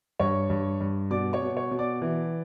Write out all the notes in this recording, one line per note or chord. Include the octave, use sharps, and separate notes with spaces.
G2 C#5 C#6
G2
G2
B2 D5 D6
C#5 C#6
B2
C#5 C#6
B2
D5 D6
E3